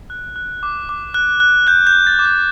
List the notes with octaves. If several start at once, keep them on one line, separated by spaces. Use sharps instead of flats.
F#6
F#6
D6
D6
F#6
F#6
F#6 G6
G6
F#6
A6
D6
G6